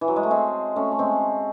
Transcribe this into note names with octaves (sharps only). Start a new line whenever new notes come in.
E3
F#3
G#3
A3
G#3 C4
A3 C#4
A3
G#3 C4